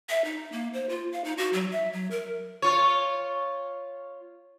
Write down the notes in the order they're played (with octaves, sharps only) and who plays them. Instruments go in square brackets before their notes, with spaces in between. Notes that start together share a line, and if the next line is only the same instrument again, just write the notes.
[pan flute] E5
D#4
A#3
C5
F4
F5
D#4
F#4
F#3
E5
F#3
A#4
[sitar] F4 C#5